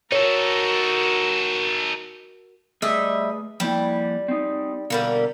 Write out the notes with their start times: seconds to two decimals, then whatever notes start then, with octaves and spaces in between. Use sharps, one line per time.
0.12 D#4 F#4 A4 A#4 C#5
2.82 G3 A3 G#4 B4 D#5 E5
3.60 F3 G3 A#3 E4
4.28 C4 D#4
4.90 B2 D3 G3 A#3